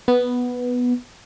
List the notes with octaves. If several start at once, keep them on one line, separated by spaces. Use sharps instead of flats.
B3